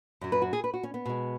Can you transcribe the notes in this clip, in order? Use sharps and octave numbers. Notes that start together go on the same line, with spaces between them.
F#2 F#3
B4
F#4
G#4
B4
F#4
C#4
B3
B2 G#3